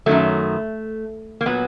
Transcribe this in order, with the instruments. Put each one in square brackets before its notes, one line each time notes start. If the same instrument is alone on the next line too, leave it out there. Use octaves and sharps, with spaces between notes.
[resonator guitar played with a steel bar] F#2 D#3 F#3 A3
A#3
A#2 F#3 B3